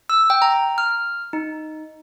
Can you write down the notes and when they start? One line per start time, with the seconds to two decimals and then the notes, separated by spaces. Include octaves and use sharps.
0.09 E6
0.30 G5
0.42 A#5
0.78 F6
1.33 D#4